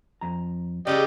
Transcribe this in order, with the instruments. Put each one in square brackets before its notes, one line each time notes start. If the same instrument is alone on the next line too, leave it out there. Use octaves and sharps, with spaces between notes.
[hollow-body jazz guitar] F2 A#5
[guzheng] C#3 G3 A4 [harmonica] G4 D#5 [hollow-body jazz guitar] D5